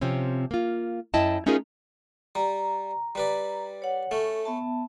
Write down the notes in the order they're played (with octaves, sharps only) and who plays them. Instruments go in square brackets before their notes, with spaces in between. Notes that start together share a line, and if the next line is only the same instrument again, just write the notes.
[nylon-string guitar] C3 F3 C4 C#4
A#3 F4
F#2 E4 D#5 G5 A5
A3 C#4 D#4 F4 G#4 A#4
[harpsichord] G3 [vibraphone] A#5
[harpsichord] G3 B4 D5
[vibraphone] C#5 F#5
[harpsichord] A3 C#4 [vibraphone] A4
[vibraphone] B3 E5 A5